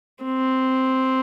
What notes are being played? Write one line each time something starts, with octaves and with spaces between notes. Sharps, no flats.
C4